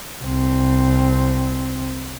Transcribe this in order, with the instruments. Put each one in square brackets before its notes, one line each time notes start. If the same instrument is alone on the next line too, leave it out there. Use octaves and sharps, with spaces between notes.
[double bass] C2 C4